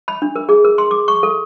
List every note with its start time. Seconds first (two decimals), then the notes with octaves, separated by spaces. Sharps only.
0.08 B5
0.22 D4
0.35 A#4
0.49 G#4
0.65 A#4
0.78 C6
0.91 D6
1.08 C#6
1.23 A4